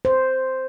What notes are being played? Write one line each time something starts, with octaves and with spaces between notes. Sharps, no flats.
C5